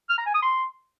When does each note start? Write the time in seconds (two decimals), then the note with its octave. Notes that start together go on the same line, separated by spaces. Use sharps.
0.10 F6
0.18 A#5
0.26 G#5
0.34 D#6
0.43 C6